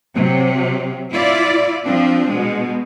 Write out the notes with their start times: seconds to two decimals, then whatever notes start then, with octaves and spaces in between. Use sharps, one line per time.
0.14 C3 F#3
1.12 E4 F4 D5
1.83 F3 C4 D4
2.29 B2 G#3